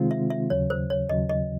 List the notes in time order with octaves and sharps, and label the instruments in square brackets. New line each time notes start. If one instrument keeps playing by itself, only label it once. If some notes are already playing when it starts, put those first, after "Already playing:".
Already playing: [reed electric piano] C3 D#3 G#3 C4 F4
[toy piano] E5
E5
[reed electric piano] D#2 C#3 F#3 [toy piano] C#5
[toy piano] C5
C#5
[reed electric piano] D#2 C#3 F#3 [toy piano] D#5
[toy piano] D#5